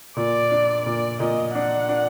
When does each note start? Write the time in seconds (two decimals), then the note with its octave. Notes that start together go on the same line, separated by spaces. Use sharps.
0.16 A#2 D5
0.51 D4
0.85 A#2 D5
1.20 A#2 D#5
1.54 D4 F#5
1.89 D4